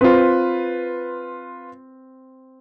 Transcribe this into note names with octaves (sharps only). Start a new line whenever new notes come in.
C4 F4 B4